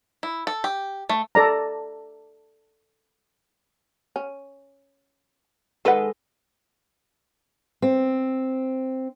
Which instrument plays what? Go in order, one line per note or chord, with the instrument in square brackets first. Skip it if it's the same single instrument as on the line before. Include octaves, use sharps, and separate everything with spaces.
[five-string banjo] E4
A4
G4
A3
[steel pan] A4 D5 A#5
[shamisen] C#4
[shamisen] D#3 F#5 [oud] G#3 A4 B4
[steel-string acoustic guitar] C4